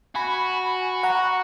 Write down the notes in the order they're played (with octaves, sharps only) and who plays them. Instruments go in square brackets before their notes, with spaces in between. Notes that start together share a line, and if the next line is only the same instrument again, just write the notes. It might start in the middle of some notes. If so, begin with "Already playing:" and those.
[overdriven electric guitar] F#4 [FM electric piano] G#5 B5
[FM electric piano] F#5 A#5